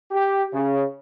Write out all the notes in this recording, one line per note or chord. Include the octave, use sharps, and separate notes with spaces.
G4
C#3